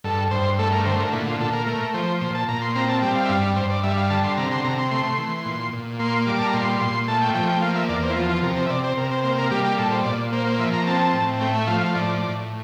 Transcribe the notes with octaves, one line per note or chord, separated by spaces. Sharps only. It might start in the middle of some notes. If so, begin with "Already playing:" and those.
G2 A4
G2 C5
A3 A4
A#4
D3 C5
A#4
A#2 E4
F4
A#2 A4
A#4
A3 A#4
F3 C5
A#2 C5
A5
A#2 A#5
C6
C4 A#5
A5
G3 G5
F5
E5
G2 F5
G2 C5
D5
G3 E5
F5
D3 A5
C6
C3 A#5
C6
C3 A#5
C6
A3 C6
E3
A#2
A#2
A#3 C6
G3 D6
A5
A#5
A#2 C6
A#2 C6
A3 A5
G5
F3 G5
G5
A#3 F5
E5
E2 D5
C5
E4
F3 F4
F4
C3 A#4
C5
E5
C3 D5
C5
C3 A#4
C5
A#3 C5
A#4
G3 G4
G4
A#2 A4
C5
A#2 D5
A#3 C5
C5
F3 E5
A#5
C4 A5
A2
A3 G5
E5
F3 F5
F5
A2 D5
A2